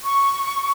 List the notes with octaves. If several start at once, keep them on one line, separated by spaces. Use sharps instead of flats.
C#6